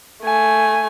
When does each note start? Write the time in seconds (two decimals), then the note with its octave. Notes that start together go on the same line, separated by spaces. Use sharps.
0.23 A3 G#5